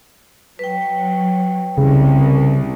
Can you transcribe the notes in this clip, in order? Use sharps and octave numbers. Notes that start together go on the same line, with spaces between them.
F#3 B4 G5
C2 C#3